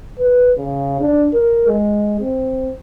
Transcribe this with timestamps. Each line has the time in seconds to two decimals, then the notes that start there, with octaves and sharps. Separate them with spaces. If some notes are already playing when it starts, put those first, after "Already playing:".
0.18 B4
0.57 C#3
1.01 D4
1.33 A#4
1.67 G#3
2.21 C4